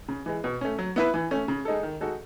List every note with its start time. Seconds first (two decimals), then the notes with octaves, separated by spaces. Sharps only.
0.08 C#3
0.26 E3 G#3
0.44 B2
0.61 A3 C#4
0.79 F#3
0.96 B3 E4 B4
1.14 E3
1.31 A3 C#4
1.48 C#3
1.65 G#3 D#4 A4
1.83 D#3
2.01 G#3 D#4 F#4 A4